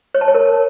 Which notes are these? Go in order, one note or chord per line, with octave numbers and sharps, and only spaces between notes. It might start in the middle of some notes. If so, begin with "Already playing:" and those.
C#5
A5
C#5
A#4